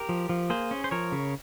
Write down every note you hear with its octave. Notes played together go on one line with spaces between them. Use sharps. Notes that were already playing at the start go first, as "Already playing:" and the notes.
Already playing: G4 A#4
F3
F3
A#3 G#4 C5
C#4
C5
F3 A#4 C#5
C#3